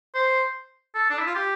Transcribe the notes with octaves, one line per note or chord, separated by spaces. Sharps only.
C5
A4
D4
E4
F4
G4